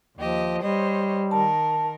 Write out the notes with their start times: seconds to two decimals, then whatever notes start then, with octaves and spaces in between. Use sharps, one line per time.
0.17 D#2 F3 G4 D#5
0.62 G3 C5 C#5 D#5
1.31 D#3 A#4 A5